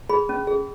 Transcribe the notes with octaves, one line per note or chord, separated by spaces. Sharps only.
G#4 B5
C#4
G#4